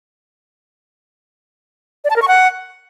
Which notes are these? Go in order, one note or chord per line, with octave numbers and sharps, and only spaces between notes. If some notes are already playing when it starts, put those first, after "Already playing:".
D5
A5
A#4
C#6
F#5